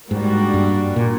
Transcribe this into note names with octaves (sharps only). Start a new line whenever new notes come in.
G#2 G3 A#3 D4 F#4
G2
A#2